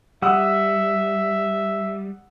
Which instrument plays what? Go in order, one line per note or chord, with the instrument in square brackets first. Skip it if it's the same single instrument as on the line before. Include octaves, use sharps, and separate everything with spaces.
[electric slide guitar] G3 [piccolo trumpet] E5 [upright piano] F#5 D#6 E6